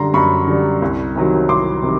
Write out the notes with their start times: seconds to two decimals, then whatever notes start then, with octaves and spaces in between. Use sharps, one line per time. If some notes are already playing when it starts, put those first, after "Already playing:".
Already playing: F#2 D3 G3 A#5 C6
0.14 F#2 B5 C#6
0.47 D3 G3
0.82 C2
1.16 C3 D#3 F#3
1.49 C2 C6 D6
1.83 C3 D#3